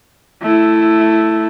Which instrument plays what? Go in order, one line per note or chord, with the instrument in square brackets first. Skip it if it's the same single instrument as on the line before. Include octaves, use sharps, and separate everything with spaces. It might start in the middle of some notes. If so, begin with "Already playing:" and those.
[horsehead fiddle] A3 E4